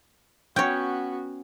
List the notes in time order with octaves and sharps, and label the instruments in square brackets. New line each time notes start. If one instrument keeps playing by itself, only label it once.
[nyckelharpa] B3 F#4 [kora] C#4 [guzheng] C#5 G5